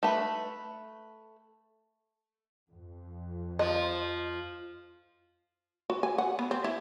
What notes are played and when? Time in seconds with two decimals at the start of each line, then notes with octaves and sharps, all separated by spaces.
0.03 A3 B4
2.72 F2
3.59 F3 D#5
5.90 F#4
6.03 G#5
6.18 F#5
6.39 B3
6.51 C4
6.64 E4